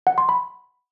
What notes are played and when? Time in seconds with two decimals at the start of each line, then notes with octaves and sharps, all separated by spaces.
0.07 F#5
0.18 C6
0.29 B5